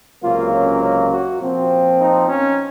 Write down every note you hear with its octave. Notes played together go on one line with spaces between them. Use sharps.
C#2 C3 F#3 A#3 F4
C#4
C#4
F#4
A#2 F3 C4
D#4
C#4